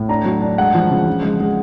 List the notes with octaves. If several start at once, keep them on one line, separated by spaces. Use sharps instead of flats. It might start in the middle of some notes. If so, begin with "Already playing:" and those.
Already playing: A2
D4 A#5
F#3
D4
G#3 F#5
F3
C#3
F3
G#3
G#3